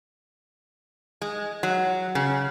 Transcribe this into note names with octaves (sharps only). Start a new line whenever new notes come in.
G#3
F#3
C#3